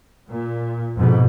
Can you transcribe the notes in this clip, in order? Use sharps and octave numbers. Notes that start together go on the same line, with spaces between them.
A#2
F2 G#2 B2